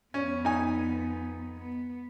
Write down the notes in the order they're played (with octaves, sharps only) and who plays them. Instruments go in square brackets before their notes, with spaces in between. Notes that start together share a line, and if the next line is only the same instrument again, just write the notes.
[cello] F2 B3 [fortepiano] C#4
[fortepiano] D#4 G#5
[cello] B3